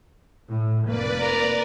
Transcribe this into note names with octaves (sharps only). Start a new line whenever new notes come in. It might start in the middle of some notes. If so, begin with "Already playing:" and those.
A2
F1 A#3 B4 D5
A#4